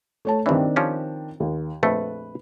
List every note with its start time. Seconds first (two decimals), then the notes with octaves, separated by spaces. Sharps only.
0.25 A3 C#5 A5
0.46 G2 D#3 E3 C4 D4
0.76 F3 C#4 G4
1.40 D#2
1.83 A#1 F2 A3 B4